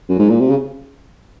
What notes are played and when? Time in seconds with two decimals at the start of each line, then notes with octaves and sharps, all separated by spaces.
0.09 F#2
0.19 G#2
0.29 A#2
0.40 C3
0.50 C#3